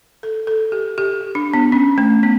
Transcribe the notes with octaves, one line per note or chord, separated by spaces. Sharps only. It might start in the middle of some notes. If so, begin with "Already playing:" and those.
A4
A4
G4
G4
D4
B3
C#4
A3
B3